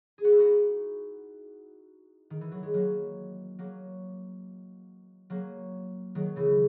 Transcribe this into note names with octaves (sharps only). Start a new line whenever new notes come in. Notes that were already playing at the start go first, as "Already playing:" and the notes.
G#4
F#4
E4
D#4 F#4
D#3
E3
F#3
G#3
F#3 A#3
F#3 A#3
F#3 A#3
D#3 F#3
C#3 E3